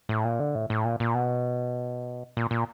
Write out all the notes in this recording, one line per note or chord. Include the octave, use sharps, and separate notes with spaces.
A2
A#2
D3
A2
A2
A#2
A#2
B2
A#2
A#2